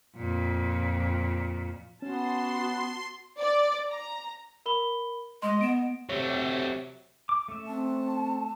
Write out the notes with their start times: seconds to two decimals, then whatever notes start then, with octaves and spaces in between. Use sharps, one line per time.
0.17 F2 A#2
2.02 B3 C#4 F#4 A5 C6
3.38 D5
3.90 A#5
4.66 A#4 B5 G7
5.42 G#3 D#5 C6
5.61 B3 D7 E7
6.09 C3 F#3 A3 C#5
7.29 D6
7.48 A3 C#4 E5
7.67 C4 A5